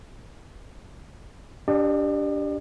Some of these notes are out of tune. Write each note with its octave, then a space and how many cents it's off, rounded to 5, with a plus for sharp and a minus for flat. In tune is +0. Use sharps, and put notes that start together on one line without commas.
D4 -20 G4 +0 D5 +40